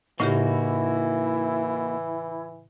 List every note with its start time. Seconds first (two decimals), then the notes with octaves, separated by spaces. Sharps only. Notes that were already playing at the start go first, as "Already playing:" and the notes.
0.20 A2 C#3 E3 A#3 D#4 E4 F#4 G4